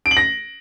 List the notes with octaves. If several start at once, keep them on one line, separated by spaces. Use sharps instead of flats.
D7
F#7
A#6